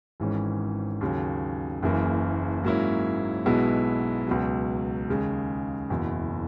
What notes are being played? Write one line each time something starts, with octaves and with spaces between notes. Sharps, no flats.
G#1 G#2 E3 G#3 C#4
D#2 C#3 F#3
F#1 F#2 C#3 E3 A#3
G#2 F#3 A#3 C#4 E4
B1 B2 G#3 B3 E4
C#2 B2 F#3
D#2 C#3 G#3
F#1 E2 B2